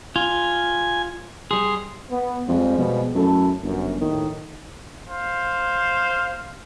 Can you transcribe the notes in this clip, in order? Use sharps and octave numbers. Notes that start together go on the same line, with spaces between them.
F4 G#5
G3 G#4 C6
B3
F2 F3 G3 G#3
B2
F#2 A3 E4 A4
G1 F#2
A#1 D#2 A2 D#3
C5 F5